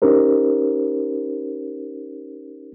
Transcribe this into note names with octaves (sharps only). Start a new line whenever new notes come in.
C#4 D#4 G4 A#4 C5